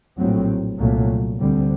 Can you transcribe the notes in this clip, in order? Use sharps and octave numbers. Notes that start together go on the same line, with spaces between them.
A#1 A2 F#3 C4
C2 A#2 F#3 A3
D2 D3 G3 C4